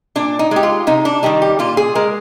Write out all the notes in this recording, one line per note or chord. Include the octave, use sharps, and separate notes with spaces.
A#2 D4
D#4
G#3 G4
F4
C3 D#4
D4
D#3 G3 D#4
G4
A#2 F4
G#4
G#3 A#4